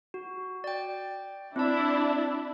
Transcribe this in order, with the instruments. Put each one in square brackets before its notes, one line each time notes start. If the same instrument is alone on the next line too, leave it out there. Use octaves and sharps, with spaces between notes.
[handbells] F#4
D5 G5
[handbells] C4 A5 [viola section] D4 E4